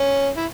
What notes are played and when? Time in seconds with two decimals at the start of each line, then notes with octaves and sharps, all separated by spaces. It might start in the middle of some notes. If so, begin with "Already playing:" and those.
Already playing: C#4
0.37 E4